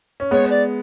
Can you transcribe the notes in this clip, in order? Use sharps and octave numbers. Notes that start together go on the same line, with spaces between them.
C#4
G#3 B3 C#5
D5